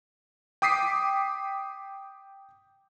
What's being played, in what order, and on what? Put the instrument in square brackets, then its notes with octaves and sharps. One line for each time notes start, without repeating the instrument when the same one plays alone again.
[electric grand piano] G5 D6 D#6 B6 C7